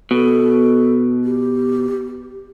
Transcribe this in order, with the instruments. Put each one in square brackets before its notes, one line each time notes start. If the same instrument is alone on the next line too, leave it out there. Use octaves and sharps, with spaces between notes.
[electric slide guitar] B2 [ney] A4
[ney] G4